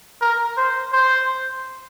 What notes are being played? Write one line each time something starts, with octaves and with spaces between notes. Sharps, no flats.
A#4
C5
C5